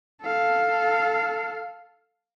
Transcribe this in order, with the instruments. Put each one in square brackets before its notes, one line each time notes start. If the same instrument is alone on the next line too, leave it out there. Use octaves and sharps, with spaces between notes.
[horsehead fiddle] A4 F5